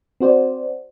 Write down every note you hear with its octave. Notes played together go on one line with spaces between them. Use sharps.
C4 F#4 C5 D5